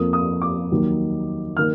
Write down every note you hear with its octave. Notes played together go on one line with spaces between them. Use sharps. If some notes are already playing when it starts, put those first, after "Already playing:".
Already playing: F2 F3 A#3 D#6
D#6
D6
D#2 D#3 F#3 A#3
D#3 A#3 F6